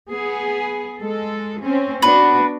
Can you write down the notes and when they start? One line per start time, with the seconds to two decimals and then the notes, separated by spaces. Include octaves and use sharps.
0.10 B3 G#4
1.00 G#3 A4
1.62 C4 C#4
2.02 B3 D4 F#4 B4